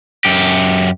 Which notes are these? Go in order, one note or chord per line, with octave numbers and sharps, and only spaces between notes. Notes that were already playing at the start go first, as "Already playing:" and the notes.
F#2 G4